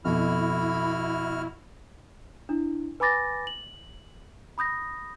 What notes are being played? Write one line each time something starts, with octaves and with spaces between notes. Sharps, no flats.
F2 B2 E4 F#4 B5 F6
D4 E4
B4 G#5 B5 D6 A6 A#6
F#7
B5 D#6 G6 A#6